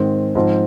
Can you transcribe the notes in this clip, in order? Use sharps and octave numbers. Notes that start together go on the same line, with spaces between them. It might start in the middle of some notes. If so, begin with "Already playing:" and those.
Already playing: G#2 D#3 G#3 C4
G#2 F3 C4